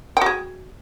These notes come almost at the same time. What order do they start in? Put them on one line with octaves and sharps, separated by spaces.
G5 F#4 G#4